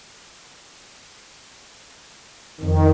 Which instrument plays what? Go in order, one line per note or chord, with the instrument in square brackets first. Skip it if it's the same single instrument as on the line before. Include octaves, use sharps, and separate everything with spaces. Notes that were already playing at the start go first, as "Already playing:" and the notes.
[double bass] F2 [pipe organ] D#3